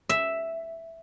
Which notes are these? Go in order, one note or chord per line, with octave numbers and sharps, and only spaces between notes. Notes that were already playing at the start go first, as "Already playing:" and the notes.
E5